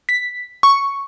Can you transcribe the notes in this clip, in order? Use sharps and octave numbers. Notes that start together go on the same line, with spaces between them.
B6
C#6